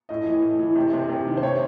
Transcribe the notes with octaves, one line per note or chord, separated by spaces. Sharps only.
A2 D#5
E3
A2
E3
C3
C3
C3
D#3
C5
C3 C#5